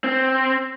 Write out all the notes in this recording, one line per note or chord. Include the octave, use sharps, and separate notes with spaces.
C4